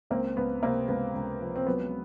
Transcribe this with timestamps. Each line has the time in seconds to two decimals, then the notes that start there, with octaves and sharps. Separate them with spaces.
0.10 C#2 A#3 C4
0.37 C#2 B3
0.62 C3 A#3 C4
0.88 C#2 B3
1.15 C#2
1.41 F3
1.56 C4
1.66 F#3 B3